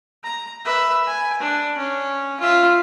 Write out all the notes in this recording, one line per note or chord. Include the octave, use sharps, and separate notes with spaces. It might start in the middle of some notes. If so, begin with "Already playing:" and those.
A#5
B4 E5
G#5
D4
C#4
F4 E5